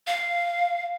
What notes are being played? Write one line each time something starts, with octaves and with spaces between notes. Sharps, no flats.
F5